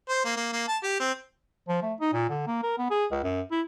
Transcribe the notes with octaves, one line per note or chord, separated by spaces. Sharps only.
C5
A#3
A#3
A#3
A5
G4
C4
F3
A3
D#4
A#2
D3
A#3
A#4
B3
G#4
C#2
F#2
E4